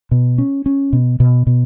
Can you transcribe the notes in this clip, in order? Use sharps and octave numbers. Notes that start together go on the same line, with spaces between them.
B2
C#4
C#4
B2
B2
B2